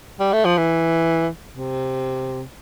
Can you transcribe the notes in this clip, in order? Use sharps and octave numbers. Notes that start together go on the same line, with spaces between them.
G3
A3
F3
E3
C3